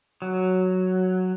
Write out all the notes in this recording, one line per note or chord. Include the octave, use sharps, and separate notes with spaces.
F#3